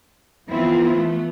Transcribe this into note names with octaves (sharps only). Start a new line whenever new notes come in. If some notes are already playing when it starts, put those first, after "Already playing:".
E3 F3 B3 C4 E4 F4
A3 B3